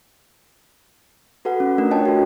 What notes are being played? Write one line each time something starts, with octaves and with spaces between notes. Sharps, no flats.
F#4 A4 B4 F#5
C#4
A3 D4 A#4
D4 F4 C#5 D#5 G5 A5
F#4 A4